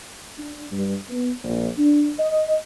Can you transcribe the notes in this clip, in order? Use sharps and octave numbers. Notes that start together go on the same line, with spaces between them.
D4
G2
B3
A#1
D4
D#5